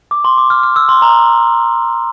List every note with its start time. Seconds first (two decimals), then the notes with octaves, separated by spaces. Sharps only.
0.11 D6
0.25 C6
0.38 D6
0.50 F6
0.63 F6
0.76 E6
0.89 C6
1.02 A#5